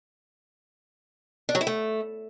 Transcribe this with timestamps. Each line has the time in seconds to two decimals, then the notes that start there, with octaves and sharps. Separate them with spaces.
1.49 D4
1.55 F#3
1.61 E4
1.67 A3